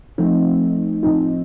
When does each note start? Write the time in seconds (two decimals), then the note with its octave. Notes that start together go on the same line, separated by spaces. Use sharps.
0.18 F3 A3 C4 D#4
1.03 A2 F3 C4 D#4